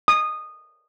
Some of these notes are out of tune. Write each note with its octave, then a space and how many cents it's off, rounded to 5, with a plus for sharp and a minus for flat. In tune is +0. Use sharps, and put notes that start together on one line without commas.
D#6 -15